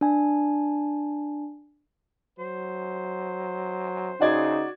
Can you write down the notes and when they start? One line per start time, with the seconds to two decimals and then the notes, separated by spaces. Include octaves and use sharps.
0.01 D4 G#5
2.39 F#3 C5
4.21 C#3 D#4 F#4 D5 G#6